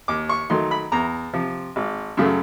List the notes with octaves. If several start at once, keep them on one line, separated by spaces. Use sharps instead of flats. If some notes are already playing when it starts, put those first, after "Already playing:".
D#2 D6
C#6
D#3 F#3 A3 C6
B5
E2 A#5
C3 F3
G#1
F#2 C#3 F#3 A3